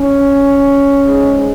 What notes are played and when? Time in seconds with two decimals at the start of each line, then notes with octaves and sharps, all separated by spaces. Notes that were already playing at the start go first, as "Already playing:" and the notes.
Already playing: C#4
1.04 G#2 G#3